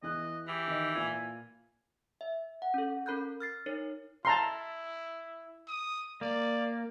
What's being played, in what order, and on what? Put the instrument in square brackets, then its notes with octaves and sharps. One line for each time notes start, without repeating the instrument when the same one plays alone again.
[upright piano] E2 E3 F#6 [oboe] D#5
[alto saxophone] E3 [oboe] G4
[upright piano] D#3 D#5
[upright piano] A#2 F4 [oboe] G#5
[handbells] E5
F#5
C#4 A4
C#4 A#4 B5 F#6 G6
F6 A6 C7
D#4 A#4 C#5
[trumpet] E4 [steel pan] A5 A#5 C6
[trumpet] D#6
[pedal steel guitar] A#3 [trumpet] D5